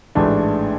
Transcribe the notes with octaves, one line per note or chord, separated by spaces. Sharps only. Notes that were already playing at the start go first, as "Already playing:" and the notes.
A1 G#2 E3 A3 D4